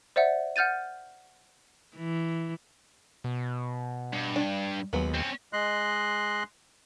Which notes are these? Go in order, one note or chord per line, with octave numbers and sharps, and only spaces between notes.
C5 D5 E5 F#5
F#5 F6 G6 A6 D#7
E3
B2
G2
D4
D#2 F#3 G#3 B3
C4 C#4
G#3 D#5 C6 F#6